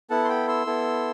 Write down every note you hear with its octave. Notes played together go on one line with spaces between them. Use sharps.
B3 E4 A4 F#5 A5
C6
G5 B5
C6 E6
B3 E4 A4